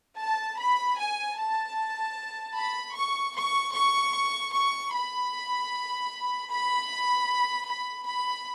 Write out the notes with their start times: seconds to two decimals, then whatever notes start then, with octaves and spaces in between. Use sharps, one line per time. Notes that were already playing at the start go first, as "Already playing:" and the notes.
0.19 A5
0.59 B5
0.99 G#5
1.38 A5
2.55 B5
2.95 C#6
3.34 C#6
3.74 C#6
4.52 C#6
4.92 B5
6.49 B5
7.67 B5
8.07 B5